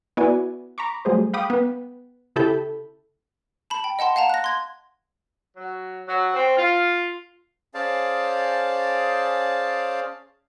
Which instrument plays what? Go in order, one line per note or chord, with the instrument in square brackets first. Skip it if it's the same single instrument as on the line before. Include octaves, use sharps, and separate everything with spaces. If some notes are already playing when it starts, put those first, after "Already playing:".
[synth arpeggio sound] B3 E4 F#4 D5 G#5
A#5 B5 C#6 D6
F#3 G3 A3 G#4 C5
F5 G5 B5 D6 D#6
B3
C#3 E4 G4 A4 B5 G6
[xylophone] A5 B5
G5
D#5 F#5 A5 C6
F5 F#5 A5 A#5
F#6 A#6
C6 G#6
[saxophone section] F#3
F#3
C4
F4
[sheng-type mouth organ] C#4 G#4 C5 D5 F5 A5